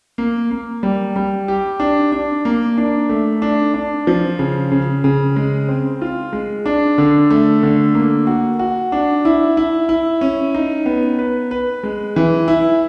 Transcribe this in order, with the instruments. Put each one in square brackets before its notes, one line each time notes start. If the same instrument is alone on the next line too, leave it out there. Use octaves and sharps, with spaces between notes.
[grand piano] A#3
A#3
G3
G3
G4
D4
D4
A#3
D4
A3
D4
D4
F3
C#3
C#3
C#3
G#3
C4
F4
G#3
D4
D3
A3
D3
A#3
F#4
F#4
D4
E4
E4
E4
C#4
D#4
B3
B4
B4
G#3
E3
E4